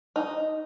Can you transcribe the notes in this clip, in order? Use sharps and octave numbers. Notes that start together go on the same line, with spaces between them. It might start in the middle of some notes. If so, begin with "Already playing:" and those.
D#4